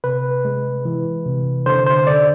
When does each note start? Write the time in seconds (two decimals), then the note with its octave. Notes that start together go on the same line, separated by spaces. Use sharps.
0.04 C3 B4
0.45 G#3
0.85 E3
1.26 C3
1.66 D3 C5
1.86 C5
2.07 D3 D5